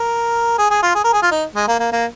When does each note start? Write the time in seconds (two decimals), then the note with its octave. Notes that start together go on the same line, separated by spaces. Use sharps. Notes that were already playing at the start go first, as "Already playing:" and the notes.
Already playing: A#4
0.58 G#4
0.70 G#4
0.83 F4
0.95 G#4
1.04 A#4
1.13 G#4
1.22 F4
1.31 D#4
1.55 G#3
1.68 A#3
1.79 A#3
1.92 A#3